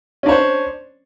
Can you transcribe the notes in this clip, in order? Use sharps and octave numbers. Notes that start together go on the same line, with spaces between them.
C#4 D4 C5 C#5